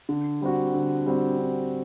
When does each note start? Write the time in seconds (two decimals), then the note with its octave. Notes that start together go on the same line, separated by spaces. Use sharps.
0.09 D3
0.41 G3 C4 F#4
0.74 D3
1.06 G3 C4 F#4
1.39 D3